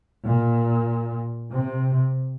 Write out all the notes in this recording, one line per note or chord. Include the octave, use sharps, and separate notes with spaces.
A#2
C3